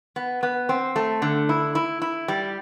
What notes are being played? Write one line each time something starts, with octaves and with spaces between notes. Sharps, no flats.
B3
B3
C4
A3
D3
E4
E4
E4
G3